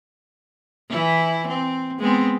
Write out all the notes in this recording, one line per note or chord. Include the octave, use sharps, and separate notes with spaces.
E3 E4
C4
G#3 B3 C4